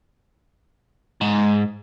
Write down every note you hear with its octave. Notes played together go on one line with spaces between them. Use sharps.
G#2